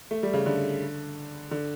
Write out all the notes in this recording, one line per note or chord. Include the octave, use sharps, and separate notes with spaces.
A3
G3
C#3
D3
D3